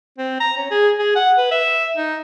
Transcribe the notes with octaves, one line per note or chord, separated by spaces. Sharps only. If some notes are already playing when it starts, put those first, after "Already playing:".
C4
A#5
C#4
G#4
G#4
F#5
B4
E5
D#4